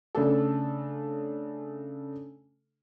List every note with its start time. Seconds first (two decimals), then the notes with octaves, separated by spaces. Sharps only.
0.15 C#3 A3 D4 A4